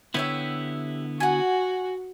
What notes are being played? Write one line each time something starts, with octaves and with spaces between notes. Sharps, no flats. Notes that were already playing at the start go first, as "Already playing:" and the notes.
D3 B3 E4 G4 C#5 E5
F#4 F#5 G#5